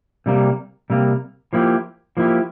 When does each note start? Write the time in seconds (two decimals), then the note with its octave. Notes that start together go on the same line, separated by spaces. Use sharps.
0.26 C3 G3 A#3
0.90 C3 G3 A#3
1.53 F3 A#3 E4 G4
2.17 F3 A#3 E4 G4